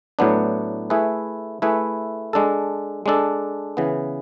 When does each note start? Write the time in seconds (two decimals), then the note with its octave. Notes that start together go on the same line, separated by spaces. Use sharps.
0.19 A2 F#3 B3 D4
0.90 A3 E4 G#4 B4
1.62 A3 E4 G#4 B4
2.33 G#3 D4 A4
3.06 G#3 D4 A4
3.77 C#3 E3 B3